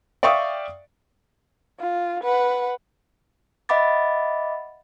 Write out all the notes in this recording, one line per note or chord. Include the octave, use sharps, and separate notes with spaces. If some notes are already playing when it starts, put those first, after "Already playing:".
D5 E5 F5 G5 C#6 D#6
F4
B4 F#5
D#5 E5 F#5 B5 D6 A6